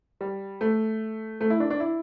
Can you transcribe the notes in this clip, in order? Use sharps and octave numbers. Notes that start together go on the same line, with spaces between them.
G3
A3
A3
E4
D4
D4
E4